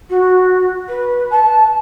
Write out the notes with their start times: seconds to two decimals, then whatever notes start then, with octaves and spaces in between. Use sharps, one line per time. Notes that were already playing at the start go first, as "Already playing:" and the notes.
0.10 F#4
0.88 B4
1.31 A5